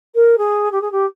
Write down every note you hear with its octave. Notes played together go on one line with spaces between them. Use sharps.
A#4
G#4
G4
G#4
G4